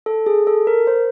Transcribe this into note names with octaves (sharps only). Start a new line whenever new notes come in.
A4
G#4
A4
A#4
C5